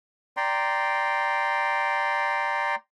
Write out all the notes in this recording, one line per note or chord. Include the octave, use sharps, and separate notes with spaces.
D5 G5 A#5 C6